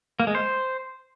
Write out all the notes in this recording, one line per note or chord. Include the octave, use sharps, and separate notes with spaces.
A#3
G#3
C5